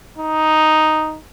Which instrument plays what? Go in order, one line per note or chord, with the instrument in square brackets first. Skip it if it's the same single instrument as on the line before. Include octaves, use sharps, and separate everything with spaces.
[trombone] D#4